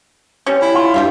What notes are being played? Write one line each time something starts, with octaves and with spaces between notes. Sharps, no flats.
G3 C#4
E4
F4
G2 G4 E5 F5